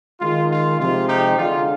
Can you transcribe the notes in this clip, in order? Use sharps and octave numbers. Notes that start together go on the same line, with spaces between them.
D#3 G#3 D#4 F4
F4
C3 F3 G#3 F4
D#4 G4
D3 G#3 D4 F4